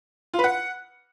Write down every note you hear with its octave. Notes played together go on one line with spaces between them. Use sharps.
F4
B4
F#5